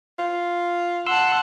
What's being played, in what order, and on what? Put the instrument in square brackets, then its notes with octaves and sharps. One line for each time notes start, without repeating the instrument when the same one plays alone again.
[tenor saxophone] F4
[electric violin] F#5 A5 [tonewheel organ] C6 E6